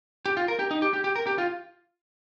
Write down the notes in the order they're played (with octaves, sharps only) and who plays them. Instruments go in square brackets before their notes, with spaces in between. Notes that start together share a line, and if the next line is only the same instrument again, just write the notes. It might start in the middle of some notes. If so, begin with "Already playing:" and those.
[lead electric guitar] G4
F4
A#4
G4
D#4
G4
G4
G4
A#4
G4
F4